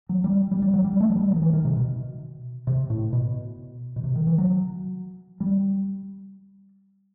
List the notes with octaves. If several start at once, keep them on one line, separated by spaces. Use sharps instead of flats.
F#3
G3
G3
G3
F#3
G3
A3
F#3
G3
F#3
D#3
E3
D#3
C3
B2
C3
A2
B2
B2
C3
D#3
E3
F#3
G3